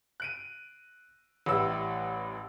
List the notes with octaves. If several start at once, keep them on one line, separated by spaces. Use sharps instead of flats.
F#6 D7 D#7
A1 A2 G3 B4 E6